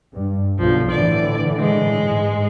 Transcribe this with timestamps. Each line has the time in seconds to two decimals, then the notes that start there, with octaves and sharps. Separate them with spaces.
0.14 G2
0.59 B1 D3 F3
0.91 A2 D3 E3 D5
1.60 G#3
2.06 G#2